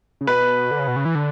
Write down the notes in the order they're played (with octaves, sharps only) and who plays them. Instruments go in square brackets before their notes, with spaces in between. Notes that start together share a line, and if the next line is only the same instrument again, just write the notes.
[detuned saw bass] C#3
[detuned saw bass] B2 [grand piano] B4
[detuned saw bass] D3
C#3
B2
C#3
E3
D3